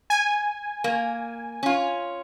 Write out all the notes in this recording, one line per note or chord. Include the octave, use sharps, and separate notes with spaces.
G#5
A#3
C#4 F4